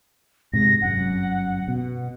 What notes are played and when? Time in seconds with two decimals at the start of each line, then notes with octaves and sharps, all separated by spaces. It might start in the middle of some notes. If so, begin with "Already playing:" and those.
0.53 G#2 C3 G#3 A#6
0.82 G1 F#2 F#5
1.68 B2